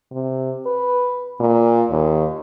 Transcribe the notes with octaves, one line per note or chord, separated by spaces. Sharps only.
C3
B4
A#2
D#2